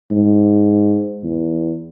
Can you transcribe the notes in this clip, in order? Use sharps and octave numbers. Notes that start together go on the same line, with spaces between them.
G#2
E2